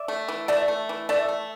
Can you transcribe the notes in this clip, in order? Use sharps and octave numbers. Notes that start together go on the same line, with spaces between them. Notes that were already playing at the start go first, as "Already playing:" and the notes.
Already playing: D5 E5
A3
E3
A3 D5 E5
A3
E3
A3 D5 E5
A3